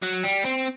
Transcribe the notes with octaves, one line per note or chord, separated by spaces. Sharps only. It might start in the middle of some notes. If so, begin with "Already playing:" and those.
F#3
G3
C4